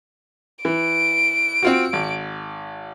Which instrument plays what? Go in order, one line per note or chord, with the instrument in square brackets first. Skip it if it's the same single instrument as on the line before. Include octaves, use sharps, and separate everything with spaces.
[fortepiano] E3 [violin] D7
[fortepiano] C4 F4 F#4
G#1